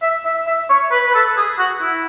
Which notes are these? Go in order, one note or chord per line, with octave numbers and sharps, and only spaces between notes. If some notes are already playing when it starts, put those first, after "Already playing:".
E5
E5
E5
C#5
B4
B4
A4
G#4
F#4
E4